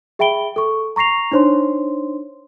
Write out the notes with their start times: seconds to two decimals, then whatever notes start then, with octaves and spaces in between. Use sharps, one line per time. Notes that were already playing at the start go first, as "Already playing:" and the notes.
0.19 G#4 E5 G5 B5 D7 G7
0.56 A4 C#6
0.96 A#5 C#6 A#6 C7 F7
1.32 D4 D#4 C5 C#5 C6